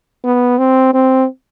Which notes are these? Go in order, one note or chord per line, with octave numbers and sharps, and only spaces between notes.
B3
C4
C4